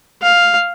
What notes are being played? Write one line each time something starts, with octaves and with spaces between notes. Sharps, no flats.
F5